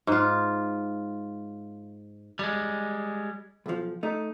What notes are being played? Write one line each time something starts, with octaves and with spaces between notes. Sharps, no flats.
G#2 F4
G3 G#3
B1 F3
A3 D#4